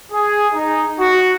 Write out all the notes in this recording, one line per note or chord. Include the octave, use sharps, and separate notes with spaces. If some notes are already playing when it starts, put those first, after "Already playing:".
G#4
D#4
F#4